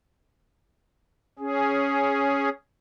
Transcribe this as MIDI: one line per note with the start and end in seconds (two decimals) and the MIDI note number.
1.39 2.49 61
1.39 2.49 68